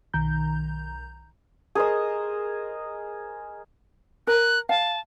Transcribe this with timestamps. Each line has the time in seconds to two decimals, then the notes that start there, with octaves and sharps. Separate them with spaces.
0.14 B1 D#3 A#5 G6
1.75 G#4 A#4 C5 D#5
4.27 A#4 F#6
4.69 F5 A5